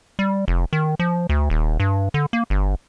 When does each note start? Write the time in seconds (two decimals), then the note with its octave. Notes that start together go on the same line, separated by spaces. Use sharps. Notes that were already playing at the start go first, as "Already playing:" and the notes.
0.19 G3
0.48 F1
0.73 D#3
0.99 F3
1.29 D2
1.50 D#1
1.80 G2
2.14 D3
2.33 A#3
2.50 G1